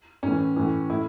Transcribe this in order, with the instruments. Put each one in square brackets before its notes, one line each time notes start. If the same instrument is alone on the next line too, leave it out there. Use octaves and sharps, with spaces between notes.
[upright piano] A2 E3 C#4
A2 E3
A2 E4